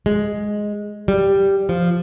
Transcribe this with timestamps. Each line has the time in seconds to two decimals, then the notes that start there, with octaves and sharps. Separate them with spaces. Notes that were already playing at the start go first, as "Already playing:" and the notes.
0.06 G#3
1.08 G3
1.69 F3